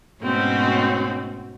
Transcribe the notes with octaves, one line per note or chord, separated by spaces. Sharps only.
G#2 B2 A3 C4 C#4 F#4